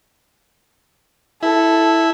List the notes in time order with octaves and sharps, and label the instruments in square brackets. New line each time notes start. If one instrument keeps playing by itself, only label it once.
[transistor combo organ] E4 [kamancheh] A4